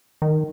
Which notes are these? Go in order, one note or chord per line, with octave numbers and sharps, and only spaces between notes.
D#3